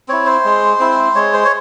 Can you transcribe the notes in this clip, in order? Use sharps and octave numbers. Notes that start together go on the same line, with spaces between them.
C4 E4 C#5
C5
G#3
C4 E4
G#3 C#5
C5
C#5